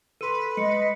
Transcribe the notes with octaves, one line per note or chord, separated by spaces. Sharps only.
A4 B4 C6 D#7
G#3 D#5 C#7